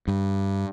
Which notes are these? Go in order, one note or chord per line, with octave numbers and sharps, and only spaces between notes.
G2